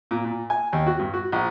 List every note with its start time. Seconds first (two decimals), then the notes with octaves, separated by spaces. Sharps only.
0.11 A#2
0.25 A#2
0.50 G#5
0.73 D#2
0.87 F#4
0.99 G2
1.14 F#4
1.32 A#1